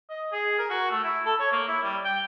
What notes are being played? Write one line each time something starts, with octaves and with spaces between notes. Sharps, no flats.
D#5
G#4
A#4
F#4
A3
E4
A4
C#5
A#3
E4
G3
G5